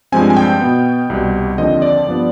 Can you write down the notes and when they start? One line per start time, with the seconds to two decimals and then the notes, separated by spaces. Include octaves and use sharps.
0.12 G2 F3 G#3 C4 G#5
0.30 G#5
0.37 G5
0.61 B2 B3
1.10 C2 B2 G3
1.58 D#2 D3 F3 C4 D#5
1.82 D5
2.07 G2 F3 B3